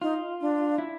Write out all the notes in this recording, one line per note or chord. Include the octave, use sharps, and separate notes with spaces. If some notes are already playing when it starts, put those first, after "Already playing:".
D#4 F4
D4
E4